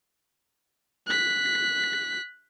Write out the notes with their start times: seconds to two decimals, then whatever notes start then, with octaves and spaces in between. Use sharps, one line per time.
1.07 F#6 B6